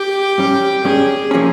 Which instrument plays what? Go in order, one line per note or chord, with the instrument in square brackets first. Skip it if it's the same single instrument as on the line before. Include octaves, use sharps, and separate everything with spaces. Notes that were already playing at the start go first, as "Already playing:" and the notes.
Already playing: [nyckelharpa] G4
[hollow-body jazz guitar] G2 G3 C#4
[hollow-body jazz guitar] G2 G3 C#4 [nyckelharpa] G#4
[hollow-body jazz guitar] C3 F3 A#3 C#4